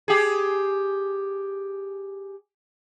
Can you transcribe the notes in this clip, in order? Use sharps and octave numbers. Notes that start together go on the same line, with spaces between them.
G4 G#4